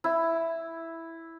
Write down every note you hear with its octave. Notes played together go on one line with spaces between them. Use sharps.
E4